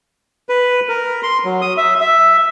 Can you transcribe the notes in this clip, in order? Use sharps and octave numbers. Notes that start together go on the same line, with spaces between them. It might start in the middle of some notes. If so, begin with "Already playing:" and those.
B4
A#4
C6
F#3
D#6
E5
E5